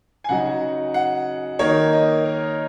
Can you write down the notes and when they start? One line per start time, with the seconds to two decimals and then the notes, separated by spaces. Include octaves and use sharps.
0.24 G#5
0.29 C#3 F#3 D#4 F#5
0.94 F#5
1.59 D#3 A#3 D#4 C#5
1.93 D#5
2.25 A#4